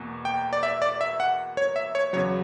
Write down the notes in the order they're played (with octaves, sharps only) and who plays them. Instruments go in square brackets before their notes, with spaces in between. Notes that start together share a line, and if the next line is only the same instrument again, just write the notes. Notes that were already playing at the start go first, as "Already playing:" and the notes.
Already playing: [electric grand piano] E2 B2 A#3
G5
D5
E5
D5
E5
F#5
C#5
E5
C#5
E2 C#3 F#3 C#5